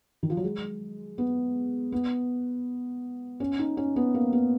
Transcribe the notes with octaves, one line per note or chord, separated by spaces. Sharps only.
D#3
F3
F#3
G#3
B3
B3
C#4
D#4
C#4
B3
A#3
B3